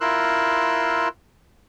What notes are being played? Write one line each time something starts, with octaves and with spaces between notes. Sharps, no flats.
E4 F4 A#4 C6 E6 F#6